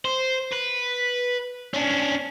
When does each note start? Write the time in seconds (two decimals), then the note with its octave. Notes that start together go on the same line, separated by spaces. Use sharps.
0.05 C5
0.53 B4
1.74 C#4 D4